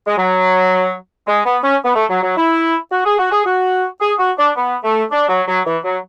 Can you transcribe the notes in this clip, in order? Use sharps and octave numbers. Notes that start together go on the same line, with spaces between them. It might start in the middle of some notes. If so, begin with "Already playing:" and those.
G#3
F#3
G#3
B3
C#4
B3
A3
F#3
F#3
E4
F#4
G#4
F#4
G#4
F#4
G#4
F#4
D4
B3
A3
D4
F#3
F#3
E3
F#3